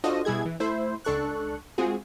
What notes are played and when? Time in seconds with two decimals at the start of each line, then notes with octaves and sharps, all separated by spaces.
0.04 D4 F4 F#4 A4 C5 D#5
0.25 B2 G3 E4 G#4 G#6
0.45 E3
0.60 A3 E4 C5
1.04 C#2 D4 A4 C#6 F#6
1.78 G#3 C4 F4 F#4 G#4